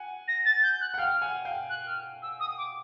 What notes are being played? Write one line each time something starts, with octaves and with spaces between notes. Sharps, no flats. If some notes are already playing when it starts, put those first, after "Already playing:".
Already playing: F#5 G#5
A#6
A6
G6
F#6
F#5
F5 G5 F6
F#5 G#5
F5 G5
F#6
F6
E6
D#6
D6